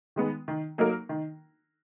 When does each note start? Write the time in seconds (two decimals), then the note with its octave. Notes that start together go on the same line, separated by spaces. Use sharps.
0.16 D#3 G#3 B3
0.48 D#3
0.78 F#3 A#3 D#4 A#4
1.09 D#3